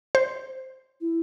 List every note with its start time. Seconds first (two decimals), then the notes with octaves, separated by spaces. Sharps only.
0.15 C5
1.01 E4